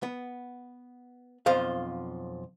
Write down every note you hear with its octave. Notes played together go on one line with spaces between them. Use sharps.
B3
B1 F2 F3 C5 F5